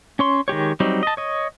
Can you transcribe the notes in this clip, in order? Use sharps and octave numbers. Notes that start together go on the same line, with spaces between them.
C#4 C#5 C6
D#3 G#3 G4 C#5
F#3 G3 C4 D#4
D#5 A5
C#5 D#5